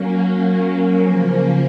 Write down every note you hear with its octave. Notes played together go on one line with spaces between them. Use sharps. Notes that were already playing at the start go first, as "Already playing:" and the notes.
Already playing: F#3 A#3 C#4
C#3 F3 A#3